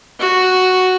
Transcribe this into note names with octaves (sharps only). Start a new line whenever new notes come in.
F#4